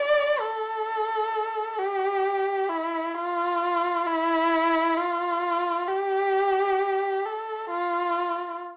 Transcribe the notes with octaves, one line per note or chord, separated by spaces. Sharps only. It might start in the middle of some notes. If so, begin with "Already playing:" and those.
Already playing: D5
A4
G4
E4
F4
E4
F4
G4
A4
F4